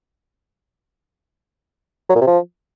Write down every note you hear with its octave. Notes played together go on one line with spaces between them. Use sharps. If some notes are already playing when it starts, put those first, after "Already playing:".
F#3
A#2
C3
F3